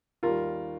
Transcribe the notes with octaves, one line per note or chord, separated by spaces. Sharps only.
D#2 D#3 G3 F4 A#4